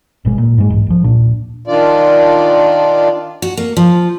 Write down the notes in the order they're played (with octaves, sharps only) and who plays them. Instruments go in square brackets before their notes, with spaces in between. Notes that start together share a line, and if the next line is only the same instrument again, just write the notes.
[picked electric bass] G#1 B2 G#3
A#2
G#2 G#3
B1 E2 G#2
B1 F3
D#1 A#2 D4
[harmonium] D#3 D4 F4 D5
[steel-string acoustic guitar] F#4
A#3
F3